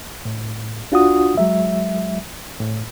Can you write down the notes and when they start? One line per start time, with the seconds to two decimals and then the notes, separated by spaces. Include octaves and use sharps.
0.25 A2
0.91 C2 D4 F4 F#4 F#5 D#6
1.37 F#3 G#3 E5
2.60 A2